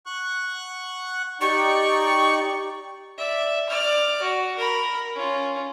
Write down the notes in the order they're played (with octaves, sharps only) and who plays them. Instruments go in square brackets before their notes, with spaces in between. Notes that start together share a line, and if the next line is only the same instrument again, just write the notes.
[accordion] F#5 C#6 F#6
[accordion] D#4 D5 G5 [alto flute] G4 [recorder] C#6
[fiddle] D5 E5
D5 F6
F#4
A#4 B5
C#4 F4